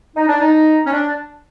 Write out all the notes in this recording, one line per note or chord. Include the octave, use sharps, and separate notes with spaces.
D#4
D4
D#4
C#4
D4